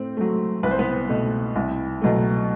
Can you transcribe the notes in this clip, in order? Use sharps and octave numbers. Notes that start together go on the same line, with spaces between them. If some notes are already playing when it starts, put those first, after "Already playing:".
Already playing: A2 C4
F#3 A3
C2 B4
C5
B3 B4
B2 A3
C2
B2 F#3 A3